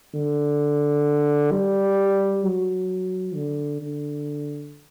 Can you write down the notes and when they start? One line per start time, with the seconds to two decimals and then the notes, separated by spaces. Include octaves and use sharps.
0.14 D3
1.52 G3
2.44 F#3
3.35 D3
3.81 D3